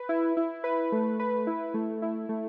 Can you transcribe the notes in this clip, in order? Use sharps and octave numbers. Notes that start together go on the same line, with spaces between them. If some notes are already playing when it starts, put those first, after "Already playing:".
Already playing: B4
E4
E4
B4
A3
B4
E4
A3
E4
A3